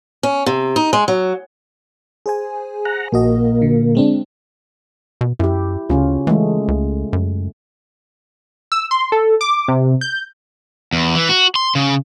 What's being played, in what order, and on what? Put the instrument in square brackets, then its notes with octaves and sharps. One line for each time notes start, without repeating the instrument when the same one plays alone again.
[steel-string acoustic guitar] C#4
C3
D#4
G#3
F#3
[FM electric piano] G#4 C5 G#5
[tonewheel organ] F#5 A#5
[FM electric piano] A#1 F#4 D#5 [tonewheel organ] A#2 A#3
[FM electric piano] D3
G#3 C4 D4
[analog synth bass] B2
[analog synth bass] F#2 [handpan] E4 G4
[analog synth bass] D2 [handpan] C#3 C#4 F4
[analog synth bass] E3 [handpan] G#3 A3
[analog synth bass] C#2
F#2
[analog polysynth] E6
C6
A4
D6
C3
G6
[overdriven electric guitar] E2
E3
F#4
C6
C#3